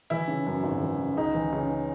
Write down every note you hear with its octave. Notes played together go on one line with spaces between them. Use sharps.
E3 E4
C#3
F#2
G#1
E3
C#3
C#2 D#4
E3
C#3